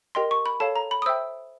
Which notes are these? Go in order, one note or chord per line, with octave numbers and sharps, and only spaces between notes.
G4 A#4 D#5 G5 C6
C#6
B5
A4 C#5 F5 A5
A#5
B5
D#6
C5 E5 G5 E6